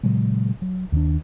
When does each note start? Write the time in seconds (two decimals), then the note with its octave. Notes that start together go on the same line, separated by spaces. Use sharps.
0.03 A#2 C#3 F#3 G#3
0.62 F#3
0.92 D#2 D#3 F#3 D4